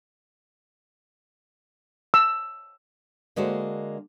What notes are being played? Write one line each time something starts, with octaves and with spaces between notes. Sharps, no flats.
E6
D3 G#3 A#3 D4 F#4 C5